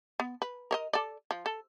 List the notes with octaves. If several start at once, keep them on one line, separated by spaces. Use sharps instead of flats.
B3
B4
A#4 C5 D#5
A4 D5
F3
A4